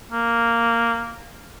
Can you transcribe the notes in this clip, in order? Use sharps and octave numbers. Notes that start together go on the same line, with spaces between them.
A#3